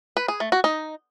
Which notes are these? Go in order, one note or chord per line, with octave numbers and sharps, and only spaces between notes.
B4
G#4
A3
F#4
D#4